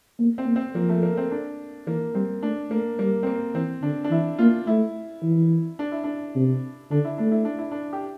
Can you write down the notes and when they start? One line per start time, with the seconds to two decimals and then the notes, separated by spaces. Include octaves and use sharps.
0.20 A#3
0.38 C4
0.46 A#3
0.56 C4
0.75 F3 A#3
0.89 A3
1.03 A#3
1.17 C4
1.31 D4
1.87 E3 A#3
2.15 G3 C4
2.43 A3 D4
2.71 A3 A#3
2.99 G3 A#3
3.23 C4
3.27 A#3
3.54 E3 C4
3.82 D3 D4
4.04 D4
4.11 E3 E4
4.39 A#3 F4
4.67 A3 E4
5.23 E3
5.79 D4
5.92 E4
6.04 D4
6.36 C3
6.91 D3 D4
7.05 E4
7.18 A3 D4
7.31 E4
7.45 D4
7.58 E4
7.71 D4
7.93 G4